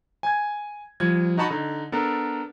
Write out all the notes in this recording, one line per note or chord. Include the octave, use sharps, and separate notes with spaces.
G#5 G#6
F3 G3 G#6
D#4 F#4 D#5 A5 B5 C#6
D3 D#4
B3 D4 A4 A#4